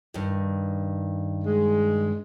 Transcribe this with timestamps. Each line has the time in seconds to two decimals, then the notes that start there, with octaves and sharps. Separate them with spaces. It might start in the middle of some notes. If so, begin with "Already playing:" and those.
0.14 G2 D#3
1.45 G#3